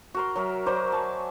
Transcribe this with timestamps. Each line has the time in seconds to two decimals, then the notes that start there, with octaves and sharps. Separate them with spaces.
0.14 F#4 A#4 C6
0.35 F#3 A#4 E5
0.66 F#3 A#4 C5 D5
0.92 G#5 A5